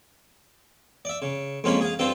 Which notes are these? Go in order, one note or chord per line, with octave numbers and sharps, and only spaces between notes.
D5 E5
C#3
F2 G#2 A#3 C#4 F4 B5
G#4 F5
G2 C4 F4 A4 G5 A5